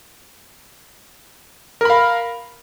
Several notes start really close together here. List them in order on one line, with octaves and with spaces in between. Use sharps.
A#4 B5 F5